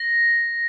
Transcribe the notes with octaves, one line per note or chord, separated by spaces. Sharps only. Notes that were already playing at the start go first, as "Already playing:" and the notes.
Already playing: A#6